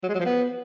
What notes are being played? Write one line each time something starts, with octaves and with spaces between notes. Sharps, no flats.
F#3
G#3
F#3
F3
B3